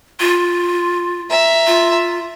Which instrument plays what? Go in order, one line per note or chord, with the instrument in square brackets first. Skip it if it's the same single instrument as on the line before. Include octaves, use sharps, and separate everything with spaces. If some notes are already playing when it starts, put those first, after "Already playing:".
[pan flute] F4
[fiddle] E5 A#5
[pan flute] F4